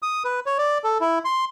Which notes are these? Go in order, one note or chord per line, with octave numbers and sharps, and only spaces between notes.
D#6
B4
C#5
D5
A4
E4
C6